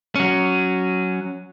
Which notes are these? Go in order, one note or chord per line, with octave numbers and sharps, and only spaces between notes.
F#3 C#4